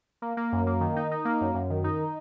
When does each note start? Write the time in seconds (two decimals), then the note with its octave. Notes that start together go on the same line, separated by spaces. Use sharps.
0.22 A#3
0.37 A#3
0.52 F#2
0.67 A#3
0.81 D#3
0.96 D#4
1.11 D#4
1.25 A#3
1.41 F#2
1.55 F#2
1.70 D#3
1.84 D#4